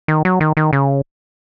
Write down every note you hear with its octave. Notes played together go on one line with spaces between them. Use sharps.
D#3
F#3
D#3
D#3
C#3